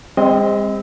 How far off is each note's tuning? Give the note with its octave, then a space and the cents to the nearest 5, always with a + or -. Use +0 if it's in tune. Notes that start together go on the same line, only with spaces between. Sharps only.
G#3 -45 C4 +0 D#5 +25